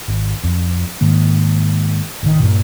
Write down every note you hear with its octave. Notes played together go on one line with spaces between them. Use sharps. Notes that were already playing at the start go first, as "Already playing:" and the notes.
G#1
F2
G#2 D#3 A#3
A1 D#3
G2 A#2